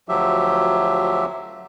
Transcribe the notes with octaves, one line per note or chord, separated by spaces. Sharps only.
D2 F3 F#3 G4 E5